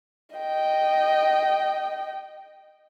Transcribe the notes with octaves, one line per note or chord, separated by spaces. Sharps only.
D#5 G5